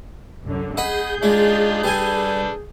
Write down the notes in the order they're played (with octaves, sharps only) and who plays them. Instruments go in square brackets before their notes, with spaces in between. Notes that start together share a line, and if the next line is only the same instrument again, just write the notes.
[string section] C2 F#2 D3
[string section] G#4 G6 [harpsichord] D#5 F#5 B5
[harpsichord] G#3 [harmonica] D4 D#4 F4
[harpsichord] G3 G#5 [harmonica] D4 A4 B4